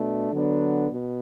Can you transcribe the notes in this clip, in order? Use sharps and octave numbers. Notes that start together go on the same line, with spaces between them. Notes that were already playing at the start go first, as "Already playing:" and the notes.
Already playing: B2 A3 D4
D3 F#3 B3 D4
B2